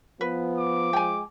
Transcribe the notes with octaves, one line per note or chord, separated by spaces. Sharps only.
F3 B3 B4
D6
G#3 G5 G#5